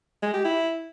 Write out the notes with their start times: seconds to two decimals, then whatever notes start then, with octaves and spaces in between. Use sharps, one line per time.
0.23 G#3
0.34 G4
0.45 E4